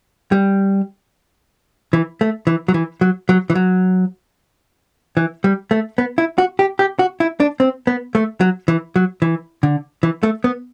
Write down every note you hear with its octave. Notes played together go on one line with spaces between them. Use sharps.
G3
E3
A3
E3
F#3
E3
F#3
F#3
E3
F#3
E3
G3
A3
B3
E4
F#4
G4
G4
F#4
E4
D4
C4
B3
A3
F#3
E3
F#3
E3
D3
E3
A3
B3